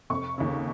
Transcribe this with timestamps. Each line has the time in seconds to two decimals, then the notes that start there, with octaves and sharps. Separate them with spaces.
0.10 F1 C#6
0.38 D#2 C#3